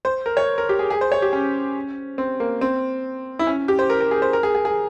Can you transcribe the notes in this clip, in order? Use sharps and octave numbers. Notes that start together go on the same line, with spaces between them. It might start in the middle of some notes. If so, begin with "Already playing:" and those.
C5
A#4
C#5
A#4
G4
G#4
G#4
C5
C#5
G4
C#4
C4
A#3
C4
E4
C#4
G4
C5
A#4
A#4
G#4
C5
A#4
G#4
G#4
G#4